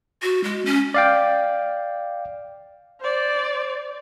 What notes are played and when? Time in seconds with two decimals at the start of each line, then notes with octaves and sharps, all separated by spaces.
0.22 F#4
0.44 G#3
0.65 C#4
0.94 D5 F5 G5
3.01 C5 D5